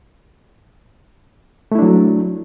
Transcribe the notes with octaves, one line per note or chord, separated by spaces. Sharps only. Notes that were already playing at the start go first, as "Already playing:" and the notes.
F#3 A3 D4 E4